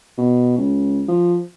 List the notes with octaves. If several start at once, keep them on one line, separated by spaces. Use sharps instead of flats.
B2
C#2
F3